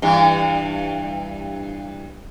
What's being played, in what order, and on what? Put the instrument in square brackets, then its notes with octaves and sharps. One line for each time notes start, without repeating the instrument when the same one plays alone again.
[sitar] G2 E3